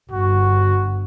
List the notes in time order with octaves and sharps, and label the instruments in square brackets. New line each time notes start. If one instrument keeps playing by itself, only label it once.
[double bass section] G1 [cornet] F#4